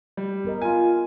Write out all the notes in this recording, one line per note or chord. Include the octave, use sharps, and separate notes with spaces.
G3
B3 A#4 D#5
F4 G#5